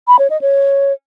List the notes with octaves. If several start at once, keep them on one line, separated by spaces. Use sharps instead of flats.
B5
C#5
D#5
C#5